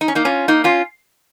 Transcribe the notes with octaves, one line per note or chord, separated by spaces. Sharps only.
D#4
C#4
A#3 D#4
C#4 F4
A#3 D#4
C#4 F4